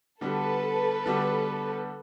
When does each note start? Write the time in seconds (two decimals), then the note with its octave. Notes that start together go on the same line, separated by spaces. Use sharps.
0.21 D3 G3 B3 D4 F#4 A4 B4
1.06 D3 G3 B3 D4 F#4